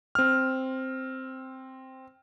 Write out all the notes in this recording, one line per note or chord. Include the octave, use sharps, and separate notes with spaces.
C4 F6